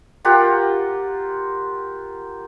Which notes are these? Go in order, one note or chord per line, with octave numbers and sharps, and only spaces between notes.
F4 G4 A#4 F#5